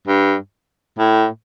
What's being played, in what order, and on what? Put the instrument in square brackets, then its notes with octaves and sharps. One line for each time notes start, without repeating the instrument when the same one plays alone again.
[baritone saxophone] G2
A2